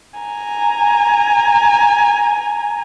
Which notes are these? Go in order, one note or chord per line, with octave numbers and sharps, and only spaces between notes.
G#5 A#5